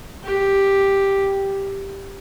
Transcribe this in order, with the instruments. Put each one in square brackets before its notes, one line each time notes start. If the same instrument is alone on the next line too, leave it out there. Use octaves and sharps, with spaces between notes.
[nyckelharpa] G4